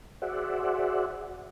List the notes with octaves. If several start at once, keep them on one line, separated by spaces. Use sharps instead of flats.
F#4 G#4 C5 D5 E5 F#5